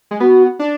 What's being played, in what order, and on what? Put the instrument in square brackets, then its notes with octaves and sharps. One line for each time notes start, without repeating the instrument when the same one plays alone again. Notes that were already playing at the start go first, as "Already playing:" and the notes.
[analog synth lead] G#3
[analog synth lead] B3 [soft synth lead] F#4
[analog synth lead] D4